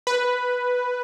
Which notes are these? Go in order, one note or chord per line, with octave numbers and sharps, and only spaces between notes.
B4